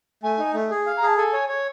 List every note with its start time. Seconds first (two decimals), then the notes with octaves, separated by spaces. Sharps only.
0.23 A3 G#5
0.39 D#4
0.54 A3
0.71 G#4
0.86 F5
0.97 A#5
1.02 G#4 A5
1.17 A4 G#5
1.33 C#5
1.49 C#5